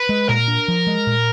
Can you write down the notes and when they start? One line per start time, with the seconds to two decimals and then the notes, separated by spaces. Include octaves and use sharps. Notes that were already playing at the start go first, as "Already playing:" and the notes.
Already playing: B4
0.09 G#3
0.29 A#2 A#4
0.48 D4
0.68 F3
0.87 G#3
1.07 A#2